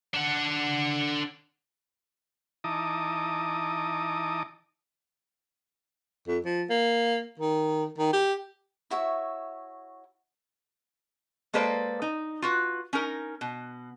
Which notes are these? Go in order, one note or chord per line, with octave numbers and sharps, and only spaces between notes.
D4 F#5
E3 D#4 A5 A#5 D6 D#6
F2
F3
A#3
D#3
D#3
G4
E4 F#4 C#5 E5
G#3 A#3 A4 B4 C5 D5
D#4
F4 F#4 B4
C#4 D#4 A#4
B2